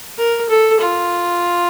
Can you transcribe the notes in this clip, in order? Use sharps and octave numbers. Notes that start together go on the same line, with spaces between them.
A#4
A4
F4